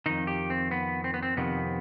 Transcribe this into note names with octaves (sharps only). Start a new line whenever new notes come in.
F2 D#3 D#4
G4
C4
B3
C4
B3
C4
F2 C3 D#3 B3